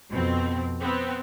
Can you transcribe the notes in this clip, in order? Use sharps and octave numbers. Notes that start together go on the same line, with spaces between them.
F2 B2 C4
B3 C4